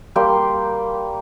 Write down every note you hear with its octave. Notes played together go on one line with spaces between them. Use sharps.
G3 A#3 G5 C6